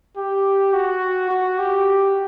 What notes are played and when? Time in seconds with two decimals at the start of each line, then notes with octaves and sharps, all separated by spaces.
0.17 G4
0.73 F#4
1.31 F#4
1.58 G4